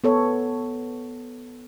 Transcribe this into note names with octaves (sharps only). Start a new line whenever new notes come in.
B3 A4 C#5